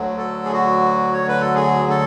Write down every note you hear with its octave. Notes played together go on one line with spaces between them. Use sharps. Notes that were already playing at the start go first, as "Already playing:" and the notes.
Already playing: D2 D3 F#3
A4
G#4
F#4
C#5
B4
A4
G#4
A4